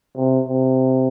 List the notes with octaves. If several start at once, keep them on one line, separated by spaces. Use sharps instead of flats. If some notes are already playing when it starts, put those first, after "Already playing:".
C3
C3